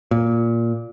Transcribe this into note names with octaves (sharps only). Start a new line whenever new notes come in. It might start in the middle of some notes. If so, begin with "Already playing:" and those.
A#2